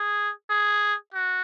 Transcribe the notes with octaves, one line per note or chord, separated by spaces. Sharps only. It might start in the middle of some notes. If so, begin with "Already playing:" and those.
Already playing: G#4
G#4
F#4